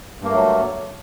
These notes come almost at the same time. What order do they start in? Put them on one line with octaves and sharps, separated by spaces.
G2 A#3 A3 F#3